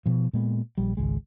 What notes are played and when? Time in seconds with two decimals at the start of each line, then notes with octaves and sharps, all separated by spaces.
0.06 B2 F3
0.33 A#2 G#3 B3
0.78 A#1 G3
0.97 G#1 C#2 G#3